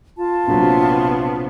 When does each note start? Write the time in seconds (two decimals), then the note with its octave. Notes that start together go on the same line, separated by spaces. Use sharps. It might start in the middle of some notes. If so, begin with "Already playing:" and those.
0.17 F4 A5
0.48 A#1 C3 F#3 B3